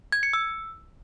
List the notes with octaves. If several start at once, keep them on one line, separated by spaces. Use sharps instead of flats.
G#6
C#7
E6